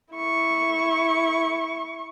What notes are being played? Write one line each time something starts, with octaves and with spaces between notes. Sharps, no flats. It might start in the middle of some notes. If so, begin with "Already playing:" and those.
E4 C#6